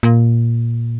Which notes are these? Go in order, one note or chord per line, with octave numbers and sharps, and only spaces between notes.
A#2